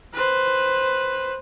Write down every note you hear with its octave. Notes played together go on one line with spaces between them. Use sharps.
B4 C5